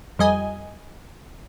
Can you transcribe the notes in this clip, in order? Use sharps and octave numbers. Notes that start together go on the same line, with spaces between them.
F2 G3 D#5 G#5